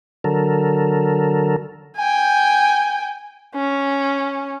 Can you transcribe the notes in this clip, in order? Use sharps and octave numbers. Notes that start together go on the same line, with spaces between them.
D3 F#3 A4 A#4
G5 G#5
C#4